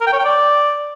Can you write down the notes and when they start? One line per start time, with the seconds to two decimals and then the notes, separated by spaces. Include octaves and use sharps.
0.01 A#4
0.07 G5
0.13 C#5
0.19 G5
0.25 D5